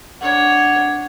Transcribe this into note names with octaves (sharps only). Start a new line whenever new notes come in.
D4 C#5 F#5